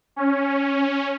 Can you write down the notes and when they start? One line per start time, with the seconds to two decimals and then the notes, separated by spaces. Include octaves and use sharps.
0.16 C#4